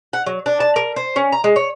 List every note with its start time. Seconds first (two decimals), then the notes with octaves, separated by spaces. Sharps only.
0.13 F#5
0.26 F#3
0.46 D4
0.60 A5
0.76 A#4
0.96 C5
1.16 C#4
1.32 A#5
1.44 G#3
1.56 C#5